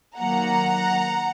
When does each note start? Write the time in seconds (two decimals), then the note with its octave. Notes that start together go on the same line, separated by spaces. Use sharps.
0.18 D#3 F#3 A#3 F#5 A#5